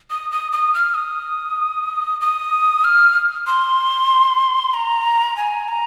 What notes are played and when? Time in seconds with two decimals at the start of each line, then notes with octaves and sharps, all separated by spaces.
0.10 D#6
0.31 D#6
0.52 D#6
0.74 F6
0.94 D#6
2.21 D#6
2.84 F6
3.47 C6
4.74 A#5
5.37 G#5
5.68 A#5